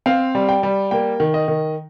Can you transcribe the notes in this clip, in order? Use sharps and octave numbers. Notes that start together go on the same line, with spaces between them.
C4 F5
G3
G5
G3
A#3 G5
D#3
D#5
D#3